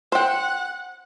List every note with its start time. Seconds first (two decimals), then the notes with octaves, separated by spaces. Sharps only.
0.12 C5 F#5 G5